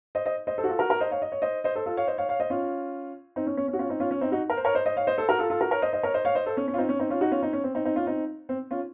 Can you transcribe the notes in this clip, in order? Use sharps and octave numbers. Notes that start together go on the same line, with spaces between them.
C5 D#5
C5 D#5
C5 D#5
A4 C5
F#4
F4 A4
F#4 A#4
F#4 A#4
C5 D#5
C#5 F5
D#5
C#5
C5 D#5
C5 D#5
A4 C5
F4 A4
C#5 F5
C5 D#5
C#5 F5
C#5 F5
C5 D#5
C#4 F4
C4 D#4
C#4
C#4
C#4
F#4
C#4 F4
C4 D#4
C#4 F4
C#4
C4 D#4
D#4 F#4
A#4
C5
A#4 C#5
C5 D#5
C5 D#5
C#5 F5
C5 D#5
A4 C5
F#4 A#4
F4 A4
F4 A4
F#4 A#4
A#4 C#5
C5 D#5
C5 D#5
A#4 C#5
C5 D#5
C#5 F5
C5 D#5
A4 C5
C#4
C#4
F4
C4 D#4
C#4
C4 D#4
C#4 F4
D#4 F#4
C#4 F4
C4 D#4
C#4
C4
C4 D#4
C4 D#4
C#4 F4
C4 D#4
C4
C#4 F4